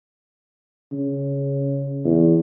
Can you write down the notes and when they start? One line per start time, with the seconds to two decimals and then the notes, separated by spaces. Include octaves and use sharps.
0.92 C#3
2.04 E2